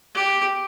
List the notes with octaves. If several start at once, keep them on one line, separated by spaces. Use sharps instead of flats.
G4